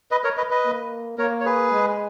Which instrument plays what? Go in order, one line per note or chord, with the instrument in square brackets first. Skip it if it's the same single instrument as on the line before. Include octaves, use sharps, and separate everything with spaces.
[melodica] B4 D#5
A#4 C#5
B4 D#5
B4 D#5
[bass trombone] A#3
[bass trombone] A#3 [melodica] A#4 C#5
[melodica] C#5
G#4 B4
[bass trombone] G#3